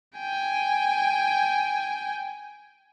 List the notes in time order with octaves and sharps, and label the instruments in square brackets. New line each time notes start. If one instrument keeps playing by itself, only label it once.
[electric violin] G5 G#5